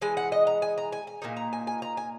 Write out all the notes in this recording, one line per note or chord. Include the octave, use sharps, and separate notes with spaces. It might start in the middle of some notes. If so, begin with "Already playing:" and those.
E3 G#3 G#5
F#5
D#5
A#5
G#5
A#5
G#5
G#5
A#2 A#3 D#4 G#5
A#5
G#5
G#5
A#5
G#5